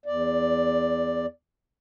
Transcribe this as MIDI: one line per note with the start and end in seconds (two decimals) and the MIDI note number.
0.06 1.26 40
0.06 1.26 74